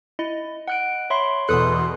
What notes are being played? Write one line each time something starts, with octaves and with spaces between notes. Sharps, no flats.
E4 D#5
F#5 F#6 D7
C#5 E5 B5 C6
E2 B2 A4 B4 C6 D#6 F#6